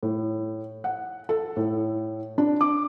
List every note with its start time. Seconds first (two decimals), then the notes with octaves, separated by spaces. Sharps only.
0.03 A2
0.84 F#5
1.29 A4
1.56 A2
2.38 D4
2.61 D6